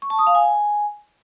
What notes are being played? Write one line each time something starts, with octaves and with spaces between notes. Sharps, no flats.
C#6
A5
D#6
F5
G#5